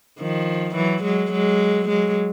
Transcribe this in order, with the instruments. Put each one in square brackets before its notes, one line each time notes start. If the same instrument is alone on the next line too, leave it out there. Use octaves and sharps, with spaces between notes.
[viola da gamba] D#3 F3
E3 F#3
F#3 G#3
F#3 G#3
F#3 G#3